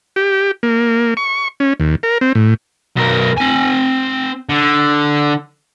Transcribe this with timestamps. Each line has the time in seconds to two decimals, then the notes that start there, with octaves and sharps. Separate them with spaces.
0.16 G4
0.63 A#3
1.17 C#6
1.60 C#4
1.80 D#2
2.03 A#4
2.21 C4
2.35 A2
2.96 B1 A#4
3.37 C4 G#5
4.49 D3